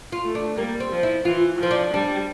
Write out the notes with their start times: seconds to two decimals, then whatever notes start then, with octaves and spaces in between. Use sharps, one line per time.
0.12 F4
0.24 A3
0.35 D4
0.58 G3 A#3
0.80 C4
0.91 F3
1.03 E4
1.25 E3 F4
1.60 F3 C4
1.71 D4
1.94 G3 D4